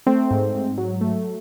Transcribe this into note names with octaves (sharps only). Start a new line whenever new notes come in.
A3 C4
G#2
G#2
F#3
A3